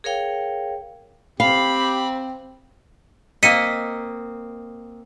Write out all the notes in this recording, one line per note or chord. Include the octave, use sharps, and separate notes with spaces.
G#4 A#4 C#5 F5 G5
C4 G4 F5 B5
A#3 C4 D#5 B6 C#7 D#7